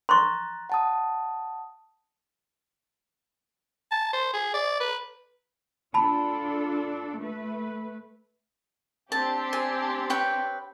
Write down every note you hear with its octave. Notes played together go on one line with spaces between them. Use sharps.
A#5 C6 C#6 F#6 A6
F#5 A5 D#6
A5
C5
G#4
D5
B4
D4 F4 A4 A5 B5
A3 B4
C4 D4 G4 A5
G#5
B4 C#5 G5